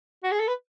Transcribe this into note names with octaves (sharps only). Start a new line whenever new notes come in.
F#4
G#4
A4
B4